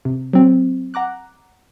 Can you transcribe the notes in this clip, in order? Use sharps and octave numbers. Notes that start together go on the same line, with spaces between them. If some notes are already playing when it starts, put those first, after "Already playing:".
C3
F#3 C4
F#5 A#5 D6 F#6